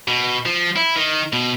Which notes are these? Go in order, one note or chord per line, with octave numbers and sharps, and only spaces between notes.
B2
F3
E4
D#3
B2